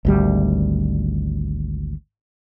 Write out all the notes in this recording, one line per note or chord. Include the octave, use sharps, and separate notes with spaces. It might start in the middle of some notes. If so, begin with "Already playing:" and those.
G#1 D2 G3